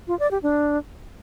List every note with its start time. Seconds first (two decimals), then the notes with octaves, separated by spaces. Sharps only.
0.08 F4
0.19 D5
0.31 G4
0.43 D4